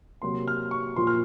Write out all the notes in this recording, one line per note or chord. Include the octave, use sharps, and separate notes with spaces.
C3 F#3 A#3 C6
F6
C#6
A#2 F3 A#3 C6
F6